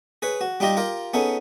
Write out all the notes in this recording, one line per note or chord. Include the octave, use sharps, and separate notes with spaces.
G#4 B4 C#5
F#4
G3 D#4 F4 G4 D#5
F4 G4 A#4
B3 C#4 D#4 G#4 A4